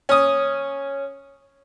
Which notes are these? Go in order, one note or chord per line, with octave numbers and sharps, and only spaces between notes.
C#4 D#6